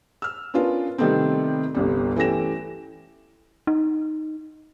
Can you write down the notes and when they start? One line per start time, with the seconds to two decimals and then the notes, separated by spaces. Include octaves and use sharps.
0.22 E6 F6
0.54 B3 C#4 D4 F4 A#4 B4
0.98 C3 D#3 G3 A3 B3 C4
1.75 G1 C2 G3
2.16 E3 A3 C#4 G4 A#6 E7
3.67 D#4